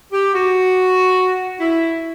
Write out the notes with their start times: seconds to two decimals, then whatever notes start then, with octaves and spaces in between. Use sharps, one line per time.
0.13 G4
0.34 F#4
1.60 E4